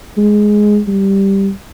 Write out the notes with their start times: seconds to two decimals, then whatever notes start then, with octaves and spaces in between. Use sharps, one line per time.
0.17 G#3
0.88 G3